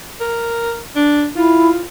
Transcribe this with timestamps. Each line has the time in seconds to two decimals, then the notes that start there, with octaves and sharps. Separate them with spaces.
0.21 A#4
0.96 D4
1.36 E4 F4